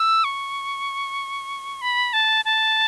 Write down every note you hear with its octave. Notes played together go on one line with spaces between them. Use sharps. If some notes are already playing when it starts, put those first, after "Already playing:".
Already playing: E6
C#6
B5
A5
A5